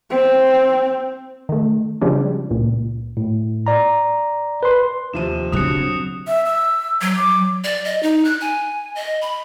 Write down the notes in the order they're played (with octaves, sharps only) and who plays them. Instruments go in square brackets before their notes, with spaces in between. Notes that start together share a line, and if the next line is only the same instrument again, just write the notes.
[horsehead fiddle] C4
[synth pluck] D#3 A3
C#3 F3 G3 G#3 C#4 D4
C#2 A#2
[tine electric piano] A2
D5 A#5
B4 C6
[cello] D#2 [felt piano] C3 F3 D#7 [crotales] E7
[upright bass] C#3 D4 [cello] F#3 C4 [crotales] D#6 F#6 C#7
[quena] E5
E6
[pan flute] F#3
[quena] D6
[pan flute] D5
D#5
D#4
F#6
G#5
D#5
B5